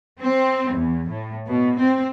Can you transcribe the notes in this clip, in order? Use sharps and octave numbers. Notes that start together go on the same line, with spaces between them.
C4
E2
A2
B2
C4